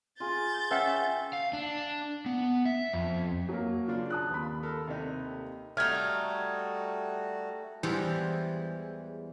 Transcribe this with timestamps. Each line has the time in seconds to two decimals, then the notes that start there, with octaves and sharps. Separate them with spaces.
0.20 F4 G#4 G6 A6
0.71 C#4 B4 E5 F#5 G5
1.33 F5
1.53 D4
2.26 B3
2.66 E5
2.93 F2
3.49 F#3 A#3
3.88 C#3 D4 F4
4.10 A5 D#6 F#6
4.30 D#2 B5
4.63 A4 A#4
4.88 C3 A3 D#4
5.77 G3 A3 D#4 F#4 F6 G#6
7.83 E2 E3 G3 G#3 G4 C5